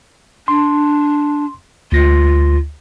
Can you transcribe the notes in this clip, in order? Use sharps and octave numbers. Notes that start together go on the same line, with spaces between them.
D4 C6
D2 F4 A#6